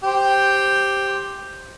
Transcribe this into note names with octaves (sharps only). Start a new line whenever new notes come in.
G4 C5 G5